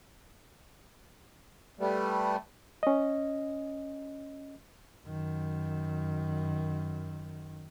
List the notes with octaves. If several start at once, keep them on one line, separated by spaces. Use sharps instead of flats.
G3 A3 B3
C#4 D#5
F#2 D#3